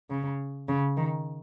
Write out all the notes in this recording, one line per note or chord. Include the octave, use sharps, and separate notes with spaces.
C#3
C#3
D#3